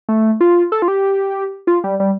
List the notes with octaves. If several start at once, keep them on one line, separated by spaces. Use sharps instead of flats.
A3
F4
A4
F4
G4
F4
G3
G3